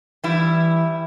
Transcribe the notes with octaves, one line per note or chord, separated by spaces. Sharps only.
E3 G3 E4